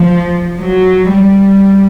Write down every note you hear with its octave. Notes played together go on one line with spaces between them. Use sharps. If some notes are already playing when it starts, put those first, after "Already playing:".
Already playing: F3
F#3
G3